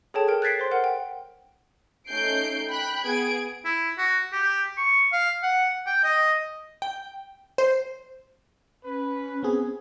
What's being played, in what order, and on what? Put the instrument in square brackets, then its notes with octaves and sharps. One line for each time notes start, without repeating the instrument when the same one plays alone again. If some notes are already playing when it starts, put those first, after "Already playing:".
[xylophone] G#4 A4 C#5 G5 A5
A#4 G5
F#6 G#6 A6 B6 C7 D7
C5 C6
A#4 F#5
G5
[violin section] A3 C#4 D#4 G6 C7 D7
G5 B5 F#6
B3 G#4 G#6 D7
[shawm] E4
F#4
G4
C#6
F5
F#5
G5
D#5
[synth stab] G5
C5
[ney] C#4 [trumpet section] B4
[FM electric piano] B3 C4 G#4